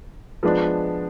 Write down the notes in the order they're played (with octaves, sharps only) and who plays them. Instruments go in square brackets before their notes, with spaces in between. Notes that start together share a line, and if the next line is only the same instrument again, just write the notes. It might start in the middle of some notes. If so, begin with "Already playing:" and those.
[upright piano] F3 G#3 B3 D4